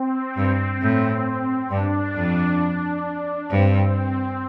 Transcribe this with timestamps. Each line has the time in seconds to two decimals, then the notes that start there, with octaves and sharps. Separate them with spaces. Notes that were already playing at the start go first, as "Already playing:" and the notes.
Already playing: C4
0.37 G2
0.82 A2
1.70 G2 D4
2.15 F2
3.50 G2 C4